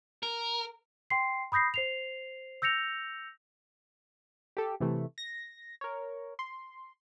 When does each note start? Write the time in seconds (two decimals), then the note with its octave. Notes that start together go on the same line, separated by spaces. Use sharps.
0.23 A#4
1.10 G5 C6 C7
1.52 B5 D#6 G6 A#6 C7
1.74 C5 C7 F7
2.62 E6 G6 A#6 C#7 F7
4.57 G4 A4
4.80 C3 E3 A3
5.18 A#6
5.81 A#4 C#5
6.39 C6